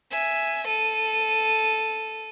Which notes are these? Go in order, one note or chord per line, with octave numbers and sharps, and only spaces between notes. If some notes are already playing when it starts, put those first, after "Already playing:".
E5 G#5
A4 D#7